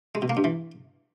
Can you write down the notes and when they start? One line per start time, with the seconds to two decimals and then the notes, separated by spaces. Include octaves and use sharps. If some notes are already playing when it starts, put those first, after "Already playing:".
0.15 G#3
0.22 B2
0.30 A#3
0.37 G2
0.44 E3